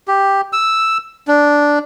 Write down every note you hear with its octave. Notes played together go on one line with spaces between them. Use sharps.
G4
E6
D4